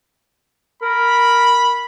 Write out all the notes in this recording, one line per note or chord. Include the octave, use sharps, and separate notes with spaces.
A#4 B5